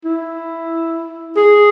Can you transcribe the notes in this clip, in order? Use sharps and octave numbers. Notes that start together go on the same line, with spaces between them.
E4
G#4